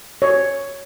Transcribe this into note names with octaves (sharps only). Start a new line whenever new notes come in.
C#5